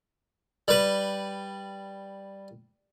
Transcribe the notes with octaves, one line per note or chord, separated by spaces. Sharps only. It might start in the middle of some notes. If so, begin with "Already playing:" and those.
G3 B4